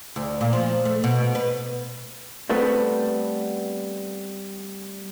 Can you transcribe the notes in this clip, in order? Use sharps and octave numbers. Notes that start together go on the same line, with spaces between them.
D2
A#2
F3
A3
B2
B4
G3 A3 B3 C4 A4 B4